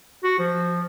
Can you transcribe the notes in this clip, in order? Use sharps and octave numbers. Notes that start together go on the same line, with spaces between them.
F#4
F3